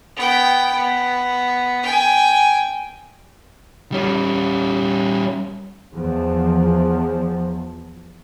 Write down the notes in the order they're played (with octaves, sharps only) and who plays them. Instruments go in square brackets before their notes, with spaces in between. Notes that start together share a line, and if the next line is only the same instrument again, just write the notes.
[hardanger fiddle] B3 G5
B3
G5 G#5
[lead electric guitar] G3 C#4
[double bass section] E2 F3